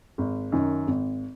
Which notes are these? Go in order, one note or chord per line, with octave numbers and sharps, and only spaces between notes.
G#1
F#2 D#3
G#1